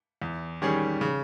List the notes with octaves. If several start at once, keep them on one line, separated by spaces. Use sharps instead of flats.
E2
D#3 G3 C#4 G#4
C#3